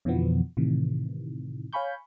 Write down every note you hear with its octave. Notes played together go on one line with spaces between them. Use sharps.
F2 B2 D3 E3 F3 B3
A2 C3 D#3 E3
C#5 F5 G#5 B5 C#6 G6